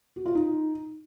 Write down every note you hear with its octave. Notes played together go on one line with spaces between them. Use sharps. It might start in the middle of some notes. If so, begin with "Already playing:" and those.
F#4
F4
D#4